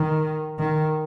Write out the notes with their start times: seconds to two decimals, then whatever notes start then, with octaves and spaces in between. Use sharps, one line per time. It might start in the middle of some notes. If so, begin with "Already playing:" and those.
Already playing: D#3
0.59 D#3